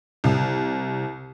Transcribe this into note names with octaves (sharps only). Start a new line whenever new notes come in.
C2